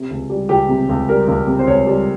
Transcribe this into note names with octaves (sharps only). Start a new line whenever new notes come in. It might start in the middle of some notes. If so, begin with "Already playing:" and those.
Already playing: C3
C#2
G3
C#2 G4
C3
C#2
G3 A#4
C#2
C3
C5
C#2 C#5
G3